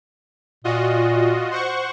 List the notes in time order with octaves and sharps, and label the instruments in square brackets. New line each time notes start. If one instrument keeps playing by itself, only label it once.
[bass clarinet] A#2 [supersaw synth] F4 F#4 D#5
[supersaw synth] C5 F#5 C#6